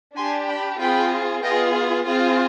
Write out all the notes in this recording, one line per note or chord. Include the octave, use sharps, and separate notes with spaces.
D4 G4 G#5 C6
G5 B5
C4 F4 G#4 G5 B5
B3 F4 G#4 D#5 G5
C4 F4 G#4